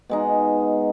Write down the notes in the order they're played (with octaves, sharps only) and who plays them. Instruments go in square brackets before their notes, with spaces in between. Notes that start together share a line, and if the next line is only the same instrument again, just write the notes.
[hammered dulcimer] B2 G#3 D#4